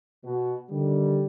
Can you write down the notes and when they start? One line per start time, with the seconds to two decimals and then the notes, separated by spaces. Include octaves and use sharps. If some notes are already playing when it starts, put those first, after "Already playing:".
0.24 B2 F#4
0.70 D3 D#3 G3